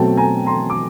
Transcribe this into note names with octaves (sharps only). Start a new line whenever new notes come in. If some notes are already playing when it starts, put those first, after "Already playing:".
Already playing: B2 F#3 A3 C4 G5 A5
G#5 A#5
A#5 C6
D6